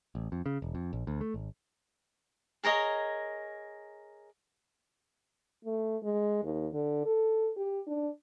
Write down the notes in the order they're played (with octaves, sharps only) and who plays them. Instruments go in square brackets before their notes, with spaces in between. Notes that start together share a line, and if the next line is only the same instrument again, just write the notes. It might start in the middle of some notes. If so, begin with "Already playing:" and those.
[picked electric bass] A1
F2
C#3
E1
F2
A#1
D2
A3
G#1
[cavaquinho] G#4 A#4 C#5 D#5
[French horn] A3
G#3
D#2
D3
A4
G4
D4